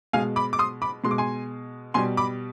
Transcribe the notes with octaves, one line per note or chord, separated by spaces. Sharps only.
B2 G#3 F5 G#5
B5 D6
D6
C6 D#6
B5 D6
B2 G#3 C6
D6
G#5 C6
B2 G3 G#5 C6
B5 D6